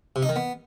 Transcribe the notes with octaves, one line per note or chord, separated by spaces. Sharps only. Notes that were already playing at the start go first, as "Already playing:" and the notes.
C3
D#4
D#3
B3